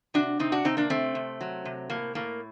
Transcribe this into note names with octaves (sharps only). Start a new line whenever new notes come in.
C3 D4 F#4
C3 C4 D#4
D4 F#4
C3 C4 D#4
A#3 D4
C3 A3 C4
C3
F#3
C3
A2 A#3
A2 A#3